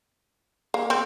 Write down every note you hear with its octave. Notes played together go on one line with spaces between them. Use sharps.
A#3
C4